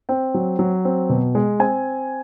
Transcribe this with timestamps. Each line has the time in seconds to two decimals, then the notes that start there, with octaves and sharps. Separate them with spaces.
0.09 C4 G5
0.34 F#3
0.59 F#3
0.85 C4
1.09 B2
1.35 G#3
1.59 C4 G#5